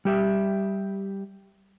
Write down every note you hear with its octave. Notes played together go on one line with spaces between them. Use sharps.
G3 G4 E5